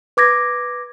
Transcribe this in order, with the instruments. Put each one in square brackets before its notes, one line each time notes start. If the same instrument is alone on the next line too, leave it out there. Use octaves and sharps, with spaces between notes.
[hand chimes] B4 D6 G#6 A#6